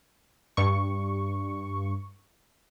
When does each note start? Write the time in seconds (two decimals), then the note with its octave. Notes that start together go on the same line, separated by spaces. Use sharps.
0.57 G2 C#6